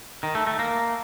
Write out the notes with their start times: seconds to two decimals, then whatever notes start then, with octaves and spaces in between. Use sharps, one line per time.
0.23 D#3
0.35 A3
0.47 A3
0.59 A#3